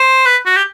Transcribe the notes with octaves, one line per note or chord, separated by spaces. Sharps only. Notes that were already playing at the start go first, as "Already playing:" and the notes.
Already playing: C5
B4
F#4
G4